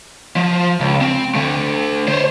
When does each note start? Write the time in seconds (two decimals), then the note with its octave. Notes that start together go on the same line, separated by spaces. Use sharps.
0.36 F3
0.80 C#2
1.01 C4
1.35 D3 A3
2.08 C5 C#5